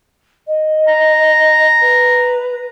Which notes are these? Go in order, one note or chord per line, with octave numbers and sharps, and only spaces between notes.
D#5
A#5
B4